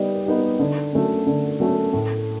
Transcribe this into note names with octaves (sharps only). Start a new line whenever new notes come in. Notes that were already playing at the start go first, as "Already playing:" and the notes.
Already playing: G3 B3 D#4 G4
B3 D#4 G4
D3
F#3 A3 C#4
D3
F#3 A3 C#4
A2